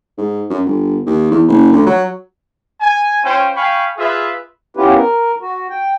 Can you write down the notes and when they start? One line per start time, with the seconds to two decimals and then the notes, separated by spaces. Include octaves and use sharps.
0.18 G#2
0.50 F#2
0.65 G1
1.07 D#2
1.31 E2
1.48 F#1
1.73 D2
1.86 F#3
2.80 G#5
3.23 C#4 F4 C5 C#5 G5
3.56 F5 G5 G#5 B5 C#6
3.98 F4 G#4 B4 E5
4.77 B3 C#4 E4 F4 G4 B4
4.95 A#4
5.41 F#4
5.70 G5